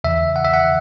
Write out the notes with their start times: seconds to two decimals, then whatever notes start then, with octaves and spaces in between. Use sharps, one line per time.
0.04 E2 C#3 E3 E5
0.36 F#5
0.45 E5
0.54 F#5